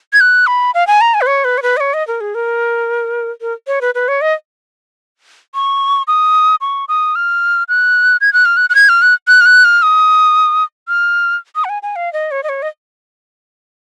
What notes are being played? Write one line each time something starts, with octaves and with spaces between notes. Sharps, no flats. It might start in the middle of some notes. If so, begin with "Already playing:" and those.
G#6
F#6
B5
F5
G#5
A#5
G#5
B4
C#5
B4
C#5
B4
D#5
C#5
D#5
A#4
G#4
A#4
A#4
C#5
B4
B4
C#5
D#5
C#6
D#6
C#6
D#6
F6
F#6
G#6
F#6
F6
F#6
F#6
G#6
F6
F#6
F#6
F6
F#6
F6
D#6
F6
D#6
F#5
G#5
G#5
F5
D#5
C#5
D#5
C#5
D#5